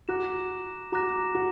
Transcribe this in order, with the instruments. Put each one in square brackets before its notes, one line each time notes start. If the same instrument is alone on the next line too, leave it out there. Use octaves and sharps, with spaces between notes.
[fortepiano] F#4 [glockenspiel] A#5 D6 F#6 A#6 E7
[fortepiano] F#4 [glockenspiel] A#5 D6 F#6 A#6 E7
[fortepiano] F#4